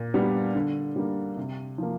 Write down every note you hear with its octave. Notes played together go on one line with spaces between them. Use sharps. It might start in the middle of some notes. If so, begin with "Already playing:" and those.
Already playing: A#2
G3 B3 D4 G4
D3
G3 A#3
C3
F3 A#3